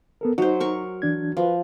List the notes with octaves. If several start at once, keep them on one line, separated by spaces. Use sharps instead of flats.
B3 A4 A#4
F#3 D#4 C5
A#4 C#6
E3 D4 G#6
F3 B4